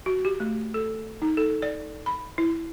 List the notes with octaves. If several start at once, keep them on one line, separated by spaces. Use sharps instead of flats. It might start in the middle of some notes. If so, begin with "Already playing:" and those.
F#4
G4
A3
A4
D#4
A4
D5
B5
E4